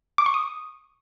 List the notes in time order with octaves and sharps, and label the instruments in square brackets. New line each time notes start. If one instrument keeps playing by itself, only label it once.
[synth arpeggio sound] D6
C#6
D#6